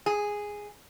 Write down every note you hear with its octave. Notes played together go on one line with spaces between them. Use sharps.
G#4